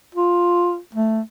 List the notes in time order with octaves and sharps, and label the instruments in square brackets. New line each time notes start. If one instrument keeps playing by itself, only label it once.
[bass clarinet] F4
A3